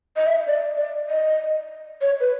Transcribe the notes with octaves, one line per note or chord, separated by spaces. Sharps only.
D#5
E5
D#5
D5
D5
D#5
C#5
B4